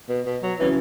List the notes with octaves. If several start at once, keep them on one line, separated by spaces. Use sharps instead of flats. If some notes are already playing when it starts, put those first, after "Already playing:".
B2
B2
F#3
C#3 E3 F#3 C#4 E4